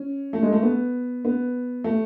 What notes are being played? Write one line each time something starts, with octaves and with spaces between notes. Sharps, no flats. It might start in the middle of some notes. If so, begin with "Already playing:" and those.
Already playing: C#4
A3
G#3
A3
B3
B3
A3